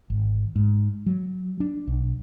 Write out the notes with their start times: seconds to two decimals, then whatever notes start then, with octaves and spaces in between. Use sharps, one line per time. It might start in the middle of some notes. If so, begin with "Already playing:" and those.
0.10 G#1
0.56 G#2
1.06 F#3
1.60 D4
1.88 B1